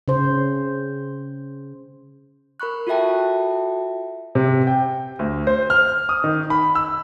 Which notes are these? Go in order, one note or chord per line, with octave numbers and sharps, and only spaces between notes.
C#3 C5
A#4 B5 C#6 F#6
F4 F#4 A4 E5 G5 A5
C3
G5
D2
C5
F6
D#6
D#3
B5
E6